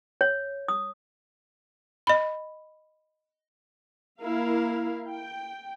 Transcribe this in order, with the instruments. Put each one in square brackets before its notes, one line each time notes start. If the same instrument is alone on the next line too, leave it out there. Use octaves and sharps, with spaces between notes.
[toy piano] C#5
D#6
[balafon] D#5 B5
[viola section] A#3 E4 A#4 F5
G5